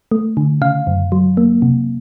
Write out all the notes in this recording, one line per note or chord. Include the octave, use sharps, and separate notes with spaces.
A3
D3
C#3 F5
F#2
F#3
A#3
C3